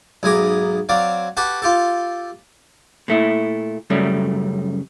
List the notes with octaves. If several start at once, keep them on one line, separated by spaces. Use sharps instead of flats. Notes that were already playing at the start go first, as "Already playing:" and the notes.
B1 G#2 G#5 A#5 D6
F#3 C4 D5 F5
F#4 G4 A4 B4
F4 G4 A4
A#2 A3 E4
F#2 C#3 G3 A3